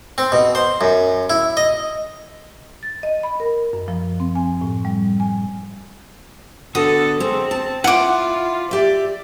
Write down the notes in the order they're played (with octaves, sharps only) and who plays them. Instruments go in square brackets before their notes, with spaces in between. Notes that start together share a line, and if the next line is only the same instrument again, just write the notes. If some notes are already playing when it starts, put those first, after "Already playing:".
[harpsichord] C4
B2
C5
F#2
E4
D#5
[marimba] A6
D#5
B5
A#4
F#2
F3
C4
G#5
A2
G3
G#5
[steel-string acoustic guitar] D3 B3 F#4 [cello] A4 [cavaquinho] D#6
[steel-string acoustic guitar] G#3 [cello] C4
[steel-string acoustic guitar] A5
[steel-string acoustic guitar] E4 [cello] F4 [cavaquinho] F#5 D6
[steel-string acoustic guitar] G4 E5 [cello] D5